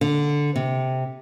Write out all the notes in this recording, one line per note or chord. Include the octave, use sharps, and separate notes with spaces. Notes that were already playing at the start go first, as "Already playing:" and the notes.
D3
C3